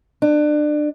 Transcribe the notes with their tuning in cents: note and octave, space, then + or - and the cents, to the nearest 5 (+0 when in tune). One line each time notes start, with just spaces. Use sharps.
D4 +25